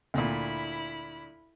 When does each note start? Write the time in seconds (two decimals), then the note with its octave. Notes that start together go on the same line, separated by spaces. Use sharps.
0.14 D2 A#2 E4 B5